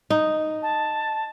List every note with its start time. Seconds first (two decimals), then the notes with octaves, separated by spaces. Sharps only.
0.10 D#4
0.63 A5